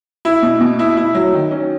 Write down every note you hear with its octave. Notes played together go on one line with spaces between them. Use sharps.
E4
B2
B2
E4
E4
F#3
D#3
C#4